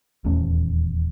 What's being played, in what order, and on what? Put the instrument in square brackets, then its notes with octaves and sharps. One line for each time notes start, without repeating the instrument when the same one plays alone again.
[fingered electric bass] D#1 E2 A3 C#4